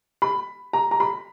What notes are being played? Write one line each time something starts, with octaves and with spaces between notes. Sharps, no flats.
B5
A#5
A#5
B5